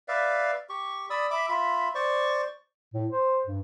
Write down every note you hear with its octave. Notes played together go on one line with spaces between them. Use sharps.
B4 D5 E5 F5
G4 C#6
D5 B5 D#6 E6
E5 B5 D6
F4 E5 B5
C5 D5 C#6
A2
C5
G2